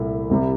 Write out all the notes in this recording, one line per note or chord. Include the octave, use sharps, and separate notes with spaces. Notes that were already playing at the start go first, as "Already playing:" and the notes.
Already playing: C2 A#2 A3 E4
C2 C3 G3